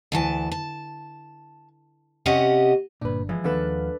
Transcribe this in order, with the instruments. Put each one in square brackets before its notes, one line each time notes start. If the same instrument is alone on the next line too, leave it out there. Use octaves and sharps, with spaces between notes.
[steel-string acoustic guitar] D2 E3 A5
A5
C3 C#4 G4 D#5 F#5
[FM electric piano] G1 D4 [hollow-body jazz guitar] A#2 B4
[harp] E3 [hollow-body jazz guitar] F3 G#3
[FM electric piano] D#2 F5 F#5 [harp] D4 A4 B4